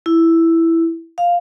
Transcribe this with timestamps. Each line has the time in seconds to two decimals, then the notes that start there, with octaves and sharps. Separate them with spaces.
0.06 E4
1.18 F5